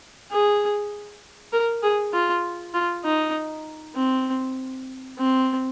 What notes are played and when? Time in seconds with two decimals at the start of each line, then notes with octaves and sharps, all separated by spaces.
0.31 G#4
1.53 A#4
1.83 G#4
2.13 F4
2.74 F4
3.04 D#4
3.96 C4
5.18 C4